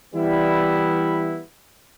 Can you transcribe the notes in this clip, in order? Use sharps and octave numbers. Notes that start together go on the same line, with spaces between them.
E3 G3 B3 E4